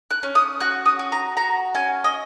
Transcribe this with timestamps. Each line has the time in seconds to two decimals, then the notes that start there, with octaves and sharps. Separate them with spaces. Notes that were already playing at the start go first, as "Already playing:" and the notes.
0.11 F#6
0.23 C#4
0.35 D#6
0.60 F#4 F#6
0.86 D#6
0.99 F#4
1.12 A#5
1.37 F#4 A#5
1.75 C#4 G#5
2.04 D#5